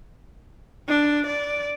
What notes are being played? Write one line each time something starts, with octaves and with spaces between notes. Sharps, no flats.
D4
D5